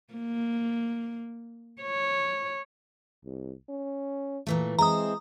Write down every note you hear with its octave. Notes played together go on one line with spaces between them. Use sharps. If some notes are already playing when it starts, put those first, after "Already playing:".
A#3
C#5
C2
C#4
A#2 E3 A3
G#3 C4 E4 A#5 D#6